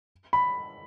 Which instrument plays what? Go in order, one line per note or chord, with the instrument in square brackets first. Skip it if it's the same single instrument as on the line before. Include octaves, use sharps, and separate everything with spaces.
[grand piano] B5